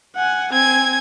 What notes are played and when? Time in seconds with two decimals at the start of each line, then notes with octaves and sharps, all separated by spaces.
0.16 F#5 G#5
0.53 C4 G#5 G#6